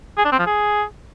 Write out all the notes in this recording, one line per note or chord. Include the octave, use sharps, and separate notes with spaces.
G#4
D4
C4
F3
G#4